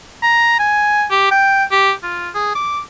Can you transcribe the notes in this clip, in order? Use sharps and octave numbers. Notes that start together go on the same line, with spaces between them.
A#5
G#5
G4
G5
G4
F4
G#4
D6